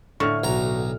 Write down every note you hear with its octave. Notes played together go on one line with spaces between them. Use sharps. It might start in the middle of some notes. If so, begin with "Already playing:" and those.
A2 D3 F5 C#6 F6
B1 F#4 A#5